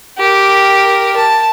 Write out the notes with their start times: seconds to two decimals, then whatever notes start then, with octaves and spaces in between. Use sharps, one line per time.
0.19 G4 A#4
1.16 A5